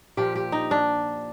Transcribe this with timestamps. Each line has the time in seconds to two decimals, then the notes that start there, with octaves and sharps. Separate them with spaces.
0.17 A#2 F3 G4
0.35 G4
0.52 D#4
0.71 D4